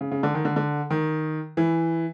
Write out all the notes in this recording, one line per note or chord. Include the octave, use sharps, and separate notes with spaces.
C#3
C#3
D3
D#3
D3
D3
D#3
E3